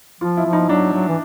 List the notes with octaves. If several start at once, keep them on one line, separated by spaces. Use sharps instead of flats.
F3 F4
E4
F3
D#4
F#3 D4
F#3
E3